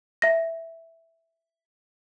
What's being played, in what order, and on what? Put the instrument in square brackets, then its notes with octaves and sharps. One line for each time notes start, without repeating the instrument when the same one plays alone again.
[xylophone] E5 A#6